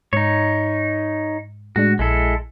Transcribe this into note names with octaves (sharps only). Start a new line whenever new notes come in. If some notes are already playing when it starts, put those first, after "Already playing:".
G#2 D#4 C#5
A2 G#3 D4 F#4
A#1 G#3 E4 A4